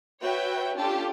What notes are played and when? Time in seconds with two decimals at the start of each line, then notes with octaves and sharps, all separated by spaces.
0.23 F#4 B4 C#5 E5 G5
0.77 C#4 D4 F4 G4 A4 A5